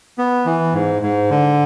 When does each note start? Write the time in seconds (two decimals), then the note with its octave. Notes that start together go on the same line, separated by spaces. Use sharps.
0.18 B3
0.46 E3
0.73 G#2
1.02 G#2
1.30 D3